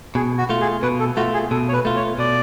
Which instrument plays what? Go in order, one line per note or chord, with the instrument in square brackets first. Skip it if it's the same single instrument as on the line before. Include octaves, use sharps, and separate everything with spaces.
[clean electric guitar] B2 [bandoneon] G#4
[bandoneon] F#4
[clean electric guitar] A3 F4
[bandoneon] G#4
[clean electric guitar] B2 [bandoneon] B4
[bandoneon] A4
[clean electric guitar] A3 F4 [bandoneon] F#4
[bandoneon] G#4
[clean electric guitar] B2 [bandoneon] A4
[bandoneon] C#5
B4
[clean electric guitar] A3 F4
[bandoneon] C#5
[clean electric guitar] B2 [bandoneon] D5